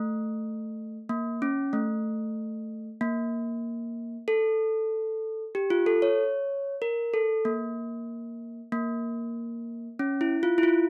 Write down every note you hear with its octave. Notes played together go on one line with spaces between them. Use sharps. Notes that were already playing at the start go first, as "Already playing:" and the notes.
Already playing: A3
A#3
C#4
A3
A#3
A4
G4
F4
A4
C#5
A#4
A4
A#3
A#3
C#4
E4
F4
E4
F4